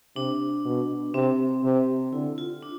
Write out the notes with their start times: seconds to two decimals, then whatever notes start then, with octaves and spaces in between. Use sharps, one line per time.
0.16 C3 D4
0.65 B2
1.14 C3 C4
1.64 C3
2.13 D3 E4
2.38 F4
2.63 D4